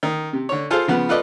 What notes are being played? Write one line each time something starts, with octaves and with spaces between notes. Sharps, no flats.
D#3
C3
D3 C#5
F4 G#4 A4 C5 F5
C#3 F3 B3 B4
F4 A4 B4 D5 D#5